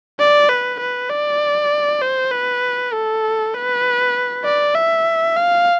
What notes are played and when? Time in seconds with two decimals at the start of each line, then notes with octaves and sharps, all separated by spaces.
0.20 D5
0.50 B4
0.81 B4
1.10 D5
2.02 C5
2.32 B4
2.93 A4
3.54 B4
4.45 D5
4.75 E5
5.37 F5